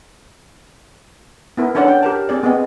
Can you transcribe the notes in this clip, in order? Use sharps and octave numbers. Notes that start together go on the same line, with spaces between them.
B3 E4 A#4
C#4 D4 A4 C#5 D5 F#5
G5
G4 A#4 A5
C4 G#4 D5
B3 C4 G#4 D#5